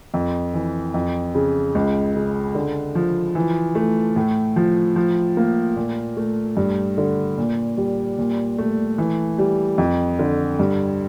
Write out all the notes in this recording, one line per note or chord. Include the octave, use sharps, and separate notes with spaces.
F2
E3
F2
C#3
C#2
C#3
D3
F3
E3
A3
A2
F3
F3
A#3
A#2
A3
G2
D3
A#2
G3
A#2
A3
E3
G3
F2
D3
G2